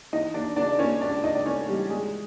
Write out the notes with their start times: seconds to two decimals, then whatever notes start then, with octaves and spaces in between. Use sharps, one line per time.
0.12 E3 D#4 D#5
0.34 D#2 D4 D5
0.56 C#3 D4 D5
0.79 D#2 C#4 C#5
1.01 C#2 D4 D5
1.24 C#2 D#4 D#5
1.35 D5
1.46 A3 C#4 C#5
1.68 E3 G3 G4
1.90 E3 G#3 G#4